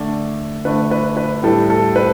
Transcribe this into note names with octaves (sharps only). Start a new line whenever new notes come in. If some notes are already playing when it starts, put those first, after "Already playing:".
Already playing: D3 A3 D5
D3 A3 B4
B4
B4
A2 G3 A4
A4
B4